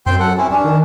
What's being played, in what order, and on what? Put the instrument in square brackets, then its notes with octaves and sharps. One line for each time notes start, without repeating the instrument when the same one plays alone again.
[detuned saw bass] F#2 [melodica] C4 G5 C6
[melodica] A4 F#5
C4 C#4 E4
[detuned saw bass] G2 [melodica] C#4 D4
[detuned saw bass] D#3